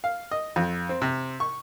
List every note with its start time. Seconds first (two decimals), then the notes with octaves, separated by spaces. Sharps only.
0.04 F5
0.31 D#5
0.56 F2
0.89 C4
1.02 C3
1.40 C#6